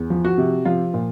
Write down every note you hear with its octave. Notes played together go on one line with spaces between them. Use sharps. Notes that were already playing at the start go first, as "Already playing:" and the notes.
Already playing: E2
F3
F#4
C3
F3 F4
A#2